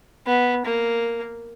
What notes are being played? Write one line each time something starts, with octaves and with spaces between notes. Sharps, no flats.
B3
A#3